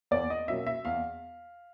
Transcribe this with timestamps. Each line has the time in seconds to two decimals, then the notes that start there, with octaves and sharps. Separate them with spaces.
0.11 E2 D5
0.30 D#5
0.48 B2 F#3 A#3 C#4 E5
0.67 E5
0.85 E2 F5